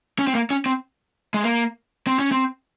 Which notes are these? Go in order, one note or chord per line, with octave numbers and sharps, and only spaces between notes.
C#4
C4
A#3
C#4
C4
G#3
A#3
C4
C#4
C4